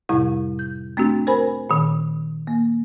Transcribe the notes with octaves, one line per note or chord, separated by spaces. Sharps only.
F2 A2 C3 G3 E4
G6
A3 C4 D4 F#4
A#4 C5 G#5 B5
A#2 D#3
A#3